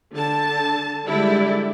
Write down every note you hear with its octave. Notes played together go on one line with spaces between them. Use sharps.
D3 A5
D3 G3 G#3 E4 G4 D5